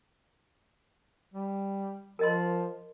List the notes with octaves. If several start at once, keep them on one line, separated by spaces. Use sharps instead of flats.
G3
F3 A#4 D#5 C6